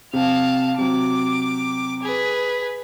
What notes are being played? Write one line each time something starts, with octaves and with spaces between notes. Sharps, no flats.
C3 F5 A5
C3 F#3 D6
G#4 B4